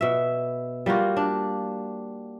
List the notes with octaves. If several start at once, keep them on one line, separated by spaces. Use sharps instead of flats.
B2 E5
G3 A#3 F4 F#4
D4